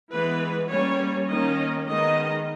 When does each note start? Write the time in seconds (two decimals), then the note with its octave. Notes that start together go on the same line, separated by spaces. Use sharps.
0.12 E3 G#3 B3 B4
0.71 G3 A#3 C#4 C#5
1.29 D#3 A#3 C#4 D#5
1.87 D#3 G#3 B3 D#5